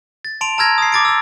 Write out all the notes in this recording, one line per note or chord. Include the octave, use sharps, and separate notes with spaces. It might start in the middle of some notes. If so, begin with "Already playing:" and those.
A6
A5 C6 D7 F7
A5 A#5 E6 F6 G#6 A#6
D#6 C7
D6 A6 D7
E6 A6